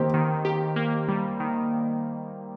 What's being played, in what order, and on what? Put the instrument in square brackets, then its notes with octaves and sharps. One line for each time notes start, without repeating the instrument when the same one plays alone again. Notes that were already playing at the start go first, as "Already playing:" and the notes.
Already playing: [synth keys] D#3 A#3 G4 [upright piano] C4
[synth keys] D#3
G4
A#3
G3
D#3